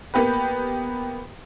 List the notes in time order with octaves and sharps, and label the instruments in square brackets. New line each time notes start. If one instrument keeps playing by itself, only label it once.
[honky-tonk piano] A#3 B3 G4 B4